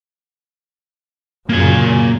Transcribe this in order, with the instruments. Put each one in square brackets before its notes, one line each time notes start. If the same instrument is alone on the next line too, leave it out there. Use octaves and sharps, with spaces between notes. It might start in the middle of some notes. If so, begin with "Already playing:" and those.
[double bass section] F#2 A#2 C#3 [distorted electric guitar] A#3 G#5